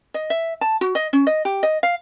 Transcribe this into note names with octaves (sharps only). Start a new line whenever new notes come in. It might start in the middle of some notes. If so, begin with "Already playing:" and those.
D#5
E5
A5
F#4
D#5
C#4
D#5
G4
D#5
F5